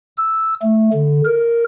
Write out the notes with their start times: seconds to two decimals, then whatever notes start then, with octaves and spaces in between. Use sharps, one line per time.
0.17 E6
0.62 A3
0.93 D3
1.25 A#4